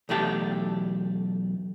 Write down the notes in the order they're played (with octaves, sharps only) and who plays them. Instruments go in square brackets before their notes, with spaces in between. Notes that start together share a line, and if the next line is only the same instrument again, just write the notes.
[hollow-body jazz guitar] B1 E2 A3 G4 A5